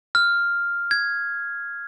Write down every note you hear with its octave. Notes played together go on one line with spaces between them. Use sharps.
F6
G#6